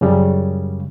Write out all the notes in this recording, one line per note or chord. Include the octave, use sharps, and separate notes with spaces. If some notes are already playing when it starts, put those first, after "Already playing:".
F#2 C#3 G3